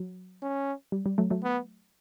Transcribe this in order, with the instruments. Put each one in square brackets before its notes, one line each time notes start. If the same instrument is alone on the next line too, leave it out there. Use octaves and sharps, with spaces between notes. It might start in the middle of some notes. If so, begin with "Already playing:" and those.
Already playing: [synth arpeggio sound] F#3
[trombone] C#4
[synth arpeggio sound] G3
G3
F#3 A3
F#3 A3
[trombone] B3